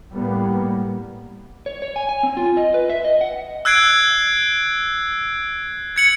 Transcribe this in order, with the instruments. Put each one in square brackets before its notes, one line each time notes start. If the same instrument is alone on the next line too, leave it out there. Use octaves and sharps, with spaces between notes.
[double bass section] A2 G3 A#3 B3
[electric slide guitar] C#5
C#5
G#5
G#5
C4
F4
D#5
B4
E5
D#5
F#5
[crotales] E6 F#6 G#6 C7 D7
G#6 C#7 F#7